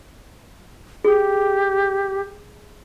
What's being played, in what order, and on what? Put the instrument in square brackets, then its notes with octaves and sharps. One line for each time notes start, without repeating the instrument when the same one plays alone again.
[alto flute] G4 [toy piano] G#4